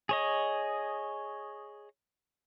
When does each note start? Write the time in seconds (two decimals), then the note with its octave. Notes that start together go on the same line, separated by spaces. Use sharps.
0.09 G#4 C#5 D#5